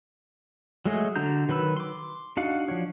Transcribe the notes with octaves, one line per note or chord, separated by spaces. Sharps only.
F#3 G#3 A3 G#4 D#5
D3 D4 F#4 A#5 G6
D#3 F#3 B4 B5 E6
C6 D6
D4 D#4 F#4 F5 F#5
F3 D4 C#5